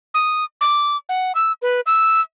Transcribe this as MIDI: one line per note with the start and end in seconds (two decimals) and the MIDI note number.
0.14 0.44 87
0.61 0.97 86
1.09 1.32 78
1.35 1.52 88
1.62 1.81 71
1.86 2.21 88